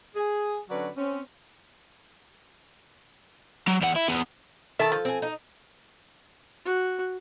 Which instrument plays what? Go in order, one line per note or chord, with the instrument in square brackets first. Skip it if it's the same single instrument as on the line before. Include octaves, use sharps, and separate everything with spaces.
[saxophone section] G#4
D3 F#3 C#4 F#4 B4 D5
C4 C#4
[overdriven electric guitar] F#3
E2 F#5
E4
E2 B3
[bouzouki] D#3 [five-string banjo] A4 [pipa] E5 A5
[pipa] F3
[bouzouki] C4 G#5
D#4
[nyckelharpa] F#4